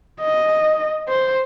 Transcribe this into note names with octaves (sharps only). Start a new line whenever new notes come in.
D#5
C5